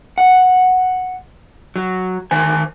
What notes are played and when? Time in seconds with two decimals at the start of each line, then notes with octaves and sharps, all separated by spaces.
0.18 F#5
1.76 F#3
2.31 D#3 C5 G#5